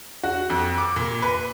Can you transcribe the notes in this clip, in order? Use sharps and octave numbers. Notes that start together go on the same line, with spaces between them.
F#4
F2
D6
A#2
B4